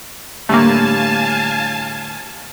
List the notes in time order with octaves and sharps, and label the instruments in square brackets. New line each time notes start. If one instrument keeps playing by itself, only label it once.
[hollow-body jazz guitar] A2 D3 G3 [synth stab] A3 A#3 [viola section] F5 G#5 A5